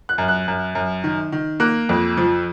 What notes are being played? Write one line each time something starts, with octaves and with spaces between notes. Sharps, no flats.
F#6
F#2
F#6
F#2
F#2
D#3
D#3
A#3 F#6
F2
F3